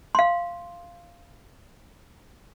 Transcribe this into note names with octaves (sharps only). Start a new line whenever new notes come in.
F5 C6